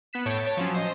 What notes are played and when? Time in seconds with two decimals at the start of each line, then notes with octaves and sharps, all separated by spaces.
0.13 B3 F#6 B6 E7
0.25 A2 C#5 A5 G6 C#7 D7
0.45 C#5 A5 B6
0.57 F3 F#3 C#4
0.74 C5 D#5